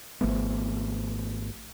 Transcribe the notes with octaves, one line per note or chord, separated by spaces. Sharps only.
G#1 F3 A3 B3